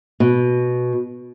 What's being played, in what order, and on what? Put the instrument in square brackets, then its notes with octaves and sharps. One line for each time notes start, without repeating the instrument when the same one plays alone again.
[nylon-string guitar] B2